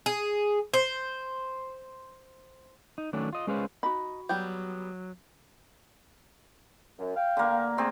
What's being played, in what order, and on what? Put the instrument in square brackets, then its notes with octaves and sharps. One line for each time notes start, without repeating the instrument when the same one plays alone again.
[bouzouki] G#4
C5
[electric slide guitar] D#4
D#3 F#3 A3 C#4 D4
F4 D#5
G#3 C#4 G#4 B4 C5 F5
[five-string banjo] D#4 [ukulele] F#4 B5
[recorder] F#3 [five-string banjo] G3 B3 G5
[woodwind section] F#2
F5 G5
[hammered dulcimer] D3 A#3
A3 C4 G#4